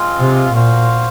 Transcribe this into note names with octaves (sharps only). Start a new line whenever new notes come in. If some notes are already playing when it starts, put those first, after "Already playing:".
Already playing: G#3 C4 F4
C3
A#2 F#4 C5 F5